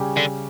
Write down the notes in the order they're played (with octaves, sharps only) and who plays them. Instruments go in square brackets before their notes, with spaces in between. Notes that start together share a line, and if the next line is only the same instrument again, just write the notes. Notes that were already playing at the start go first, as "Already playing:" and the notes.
Already playing: [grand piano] C#3 G3 C#4 G4
[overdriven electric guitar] D3